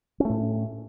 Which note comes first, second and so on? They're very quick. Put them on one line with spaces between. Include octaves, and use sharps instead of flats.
C#4 A3 A2